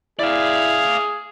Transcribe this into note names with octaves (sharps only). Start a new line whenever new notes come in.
E4 G#4 D5 F5